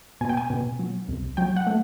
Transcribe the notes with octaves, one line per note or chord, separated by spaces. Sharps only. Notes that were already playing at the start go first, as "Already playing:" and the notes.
B2 G#5
G5
G#5
B2
F#3
C2
F#3 G5
F#5
A3